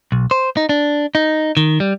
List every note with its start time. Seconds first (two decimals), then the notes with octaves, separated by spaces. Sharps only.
0.12 B1
0.31 C5
0.57 D#4
0.69 D4
1.15 D#4
1.57 D#3
1.80 G3